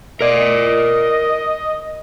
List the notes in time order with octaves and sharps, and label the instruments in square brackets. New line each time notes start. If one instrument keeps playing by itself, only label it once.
[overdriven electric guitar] A#4 D5 [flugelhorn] D#5